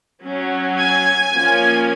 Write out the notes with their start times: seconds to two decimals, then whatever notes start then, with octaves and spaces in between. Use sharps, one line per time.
0.25 F#3 C#4
0.79 G#5
1.33 F3 A#3 C#4